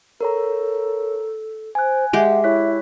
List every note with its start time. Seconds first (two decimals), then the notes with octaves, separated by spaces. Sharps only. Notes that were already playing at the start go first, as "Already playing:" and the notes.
0.21 A4 A#4 C#5 A#5
1.75 C5 G#5 F#6
2.13 G#3 G4 E5 F#5
2.44 E4 C#5 F#6 B6